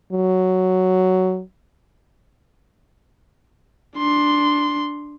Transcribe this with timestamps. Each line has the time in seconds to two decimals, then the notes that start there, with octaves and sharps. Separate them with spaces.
0.13 F#3
3.98 D4 C6